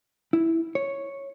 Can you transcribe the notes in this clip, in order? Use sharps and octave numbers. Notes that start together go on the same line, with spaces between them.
E4
C#5